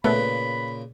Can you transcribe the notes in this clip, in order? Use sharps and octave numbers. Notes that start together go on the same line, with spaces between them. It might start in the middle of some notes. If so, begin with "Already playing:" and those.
A#2 C#3 A3 B3 B4 B5